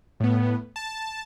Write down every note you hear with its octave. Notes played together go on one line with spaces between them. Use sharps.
A2 B3
A5